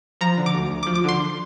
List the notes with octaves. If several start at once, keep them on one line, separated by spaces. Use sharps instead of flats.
F3 A#5
D3
D6
D2
D2
D6
F3
D6
D3 C6